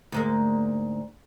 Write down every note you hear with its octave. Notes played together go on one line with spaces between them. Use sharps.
D2 G#2 A#3